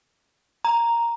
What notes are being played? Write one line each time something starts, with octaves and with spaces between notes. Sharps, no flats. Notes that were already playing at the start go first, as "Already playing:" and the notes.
A#5